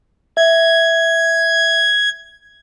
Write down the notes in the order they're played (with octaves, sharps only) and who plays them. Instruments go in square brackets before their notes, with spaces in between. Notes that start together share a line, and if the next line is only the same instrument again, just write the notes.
[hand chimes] E5 [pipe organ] G#6